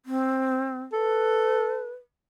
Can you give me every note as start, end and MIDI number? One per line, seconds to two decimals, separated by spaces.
0.06 0.82 60
0.93 1.90 69
0.93 1.89 71